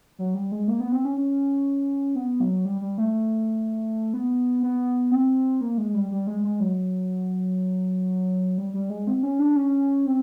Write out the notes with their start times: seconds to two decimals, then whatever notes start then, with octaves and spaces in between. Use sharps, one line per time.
0.19 F#3
0.34 G3
0.52 G#3
0.68 A#3
0.80 B3
0.92 C4
1.05 C#4
1.17 C#4
2.15 B3
2.40 F#3
2.65 G3
2.81 G3
2.98 A3
4.14 B3
4.63 B3
5.11 C4
5.61 A#3
5.78 G#3
5.94 G3
6.11 G3
6.27 G#3
6.44 G#3
6.60 F#3
8.58 G3
8.74 G3
8.90 G#3
9.07 C4
9.23 C#4
9.39 D4
9.56 C#4
10.06 C4